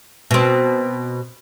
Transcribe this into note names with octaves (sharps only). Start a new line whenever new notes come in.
B2 C4